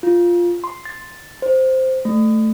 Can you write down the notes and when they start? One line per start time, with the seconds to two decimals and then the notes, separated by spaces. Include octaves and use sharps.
0.03 F4
0.64 C6
0.85 A6
1.42 C5
2.05 A3